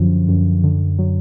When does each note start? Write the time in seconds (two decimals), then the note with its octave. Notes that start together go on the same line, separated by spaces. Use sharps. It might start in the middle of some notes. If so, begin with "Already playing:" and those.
Already playing: F#2 D3 F3
0.28 F#2
0.64 D3
0.99 F#3